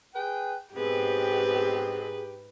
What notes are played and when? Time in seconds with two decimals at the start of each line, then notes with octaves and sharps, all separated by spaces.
0.14 G#4 B4 G5
0.75 G#2 B2 B3 C4 G4 G#4 B4